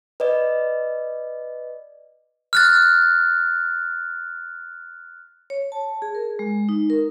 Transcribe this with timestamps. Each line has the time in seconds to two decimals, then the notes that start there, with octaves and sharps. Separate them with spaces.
0.20 B4 D5 D#5
2.53 F6 F#6 A6
5.50 C#5
5.72 A5
6.02 G#4
6.15 A#4
6.39 G#3
6.69 D#4
6.90 A#4